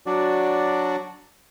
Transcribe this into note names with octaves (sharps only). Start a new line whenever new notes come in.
F#3 D4 F#4 D5